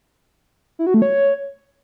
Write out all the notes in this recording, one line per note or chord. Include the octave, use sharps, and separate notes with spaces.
E4
F#4
A3
C#5